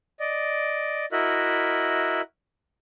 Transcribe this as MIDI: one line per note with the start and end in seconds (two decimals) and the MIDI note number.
0.20 1.06 74
0.20 1.06 75
1.12 2.22 64
1.12 2.22 66
1.12 2.22 70
1.12 2.22 75
1.12 2.22 76
1.12 2.22 90